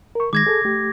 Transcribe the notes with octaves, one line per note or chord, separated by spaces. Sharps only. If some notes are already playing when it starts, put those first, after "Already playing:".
A#4 C#6
D#3 G#3 D6 G#6 A#6
G#4 A4
A3 G4